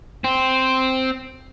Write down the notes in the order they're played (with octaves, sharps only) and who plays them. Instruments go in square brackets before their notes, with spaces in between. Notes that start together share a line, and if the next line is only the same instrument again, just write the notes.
[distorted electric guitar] C4